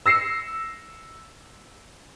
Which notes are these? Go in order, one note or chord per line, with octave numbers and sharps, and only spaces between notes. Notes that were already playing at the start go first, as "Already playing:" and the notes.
E6 A#6 C7 C#7 E7